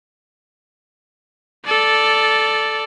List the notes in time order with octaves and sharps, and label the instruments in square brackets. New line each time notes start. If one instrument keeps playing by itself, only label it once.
[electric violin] A4 D5